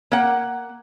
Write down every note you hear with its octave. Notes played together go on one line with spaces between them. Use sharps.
A#3 F#5